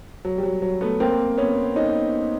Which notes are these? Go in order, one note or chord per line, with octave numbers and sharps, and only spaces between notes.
F#3
G3
F#3
F#3
A3 B3
A#3 C4
B3 C#4
C#4 D#4